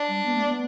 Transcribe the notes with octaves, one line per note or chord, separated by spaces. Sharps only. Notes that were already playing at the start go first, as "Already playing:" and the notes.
Already playing: D4
G3
B3
A3
B3